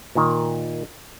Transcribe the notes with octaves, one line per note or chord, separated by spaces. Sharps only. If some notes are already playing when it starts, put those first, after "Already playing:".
A#2 D#3